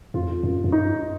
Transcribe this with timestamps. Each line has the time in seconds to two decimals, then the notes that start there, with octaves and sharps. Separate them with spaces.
0.14 F2 F4
0.43 F#2
0.64 F#2
0.72 G2 D#4